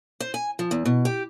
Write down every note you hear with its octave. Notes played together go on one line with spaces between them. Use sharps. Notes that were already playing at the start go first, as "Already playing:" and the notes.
C5
G#5
F3
E2
B2
G4